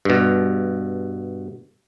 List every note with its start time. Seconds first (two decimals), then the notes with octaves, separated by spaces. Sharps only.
0.05 G2 B2